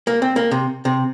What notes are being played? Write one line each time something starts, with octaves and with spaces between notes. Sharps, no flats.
A#3
C4
A#3
C3
C3